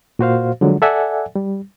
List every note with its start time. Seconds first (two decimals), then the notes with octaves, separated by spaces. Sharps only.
0.19 A#2 F#4 C5 F5
0.61 D3 F3 F#3 G#3
0.82 A4 D5 E5 F#5 G#5
1.36 G3